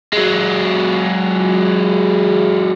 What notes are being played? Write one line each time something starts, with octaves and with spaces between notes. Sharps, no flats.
F#3 G#3